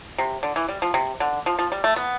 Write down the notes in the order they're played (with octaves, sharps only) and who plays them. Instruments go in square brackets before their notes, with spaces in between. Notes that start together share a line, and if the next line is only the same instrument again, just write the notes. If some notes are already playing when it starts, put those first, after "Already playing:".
[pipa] C3
D3
E3
G3
F3
C3
D3
F3
F3
G3
A3
B3